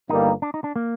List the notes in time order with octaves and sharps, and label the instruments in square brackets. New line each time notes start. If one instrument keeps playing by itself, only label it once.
[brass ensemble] G1 G2 D3 G3 A#3 [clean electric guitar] D#4
[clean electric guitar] D4
D#4
D4
A#3